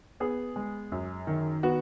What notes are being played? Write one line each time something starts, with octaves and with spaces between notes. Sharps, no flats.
B3 G#4
G#3
F#2
D#3
B3 F#4